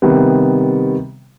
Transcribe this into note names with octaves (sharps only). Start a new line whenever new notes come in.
C3 D#3 G3 B3